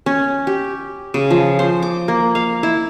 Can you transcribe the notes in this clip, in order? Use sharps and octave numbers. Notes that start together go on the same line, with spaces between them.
C#4
G4
C#3
F3
C5
D6
A#3
F5
E4